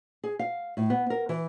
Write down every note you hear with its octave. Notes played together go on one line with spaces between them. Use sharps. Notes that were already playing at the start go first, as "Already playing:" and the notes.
G#4
F5
A2
B3
A#4
E3